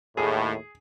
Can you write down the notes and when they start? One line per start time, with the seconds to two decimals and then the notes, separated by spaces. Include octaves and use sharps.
0.17 D#2 A2 G#4